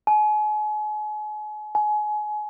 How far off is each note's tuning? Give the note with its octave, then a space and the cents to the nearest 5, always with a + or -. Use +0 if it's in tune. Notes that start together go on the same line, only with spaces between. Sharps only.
G#5 +35
G#5 +25